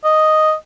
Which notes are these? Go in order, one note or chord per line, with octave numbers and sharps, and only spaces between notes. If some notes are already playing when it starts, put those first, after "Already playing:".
D#5